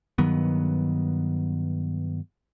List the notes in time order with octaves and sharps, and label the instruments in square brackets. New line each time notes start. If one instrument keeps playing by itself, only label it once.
[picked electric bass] G2 D#3 F#3 B3